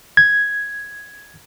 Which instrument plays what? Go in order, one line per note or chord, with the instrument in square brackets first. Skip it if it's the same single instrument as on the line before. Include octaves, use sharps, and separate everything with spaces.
[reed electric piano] G#6